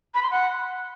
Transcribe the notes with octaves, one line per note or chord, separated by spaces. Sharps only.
B5
C6
F#5